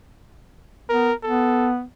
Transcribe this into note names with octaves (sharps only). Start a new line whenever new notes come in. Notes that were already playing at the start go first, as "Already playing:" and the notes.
B3 A#4
B3 A4